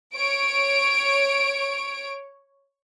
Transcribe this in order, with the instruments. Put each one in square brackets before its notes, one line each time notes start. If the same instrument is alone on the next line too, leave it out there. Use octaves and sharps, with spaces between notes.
[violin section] C#5 D7